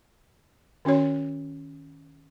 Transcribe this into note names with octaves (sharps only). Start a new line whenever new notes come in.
D#3 C#4 F#4 C#5